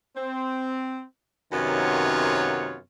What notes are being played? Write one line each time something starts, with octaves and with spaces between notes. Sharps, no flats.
C4
F#2 C3 D#3 B3 F4 C#5